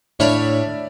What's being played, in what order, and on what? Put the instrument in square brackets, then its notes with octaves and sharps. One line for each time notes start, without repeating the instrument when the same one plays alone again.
[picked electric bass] A2 [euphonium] D4 [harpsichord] C#5 F5 B5 [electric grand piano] D5 E5